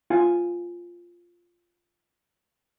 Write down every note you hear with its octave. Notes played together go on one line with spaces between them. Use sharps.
F4 G#5